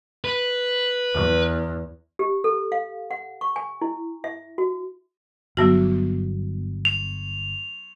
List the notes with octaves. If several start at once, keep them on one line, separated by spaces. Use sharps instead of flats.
B4
E2
G4
A4
F5
F#5
C#6
G#5
E4
E5
F#4
G1 F#3 B3 F#4
F7